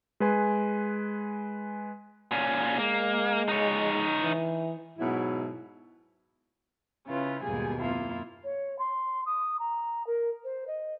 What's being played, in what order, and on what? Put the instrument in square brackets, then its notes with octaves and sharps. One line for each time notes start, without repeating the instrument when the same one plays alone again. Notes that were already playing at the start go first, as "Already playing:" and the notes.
[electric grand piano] G#3 B4 G#5 C6
[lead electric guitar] A#2 C#4
[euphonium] G#3 [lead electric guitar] A#3
[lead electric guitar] D#4 C#5
[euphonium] E3
[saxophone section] G#2 B2 F#3 E4
[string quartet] C#3 C#4 E4 F4 B4
D#2 G#2 B2 G3 G#4 G#5
F#2 A#3 E4 F4
[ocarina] C#5
C6
D#6
A#5
A#4
C5
D#5